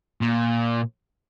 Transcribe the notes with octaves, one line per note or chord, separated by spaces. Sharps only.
A#2